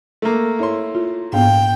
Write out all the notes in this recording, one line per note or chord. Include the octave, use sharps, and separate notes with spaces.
A3 A#3
E4 C#5 C6
F4
A#1 G#2 B3 F5 G5